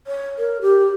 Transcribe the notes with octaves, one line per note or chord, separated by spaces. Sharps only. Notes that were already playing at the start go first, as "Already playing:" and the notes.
C#5
A#4
G4